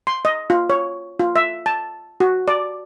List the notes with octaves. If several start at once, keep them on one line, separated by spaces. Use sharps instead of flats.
C6
D#5
F4
C#5
F4
E5
A5
F#4
D5